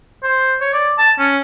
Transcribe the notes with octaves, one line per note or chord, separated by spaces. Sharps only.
C5
C#5
D5
A5
C#4